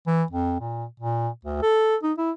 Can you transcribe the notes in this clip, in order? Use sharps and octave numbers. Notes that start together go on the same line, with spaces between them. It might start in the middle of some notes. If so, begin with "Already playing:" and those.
E3
F2
A#2
A#2
D2
A4
D#4
E4